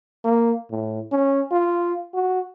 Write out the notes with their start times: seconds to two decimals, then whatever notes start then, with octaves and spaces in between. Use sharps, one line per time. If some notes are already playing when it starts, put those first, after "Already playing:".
0.24 A#3
0.71 A2
1.12 C#4
1.52 F4
2.14 F#4